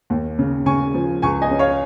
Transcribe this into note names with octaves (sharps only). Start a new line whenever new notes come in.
D#2
C#3
C#3 G#5 C#6
F3
C#2 G#5 C#6
D#5 G#5
C#4
C#5 F5